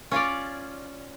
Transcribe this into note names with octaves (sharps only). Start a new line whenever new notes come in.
C#4 F4 C#5 D5